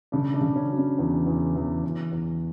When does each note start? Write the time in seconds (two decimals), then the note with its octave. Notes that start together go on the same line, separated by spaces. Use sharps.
0.12 C#3 D4
0.34 D4
0.41 C#3
0.56 C#4
0.70 F#3
0.77 C#4
0.99 E2
1.26 E2
1.56 E2
1.84 E2
2.12 E2